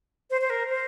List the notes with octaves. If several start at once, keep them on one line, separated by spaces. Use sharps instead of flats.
C5
C5
A#4
C5